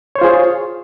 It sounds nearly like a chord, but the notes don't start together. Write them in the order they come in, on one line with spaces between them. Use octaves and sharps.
C#5 C5 F4 G#4